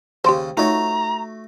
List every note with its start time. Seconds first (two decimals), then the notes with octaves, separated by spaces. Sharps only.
0.24 D#2 C#3 G4 C5
0.57 A3 D#4 F4 F#4 C#5 A#5